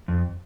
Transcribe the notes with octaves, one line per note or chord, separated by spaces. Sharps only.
F2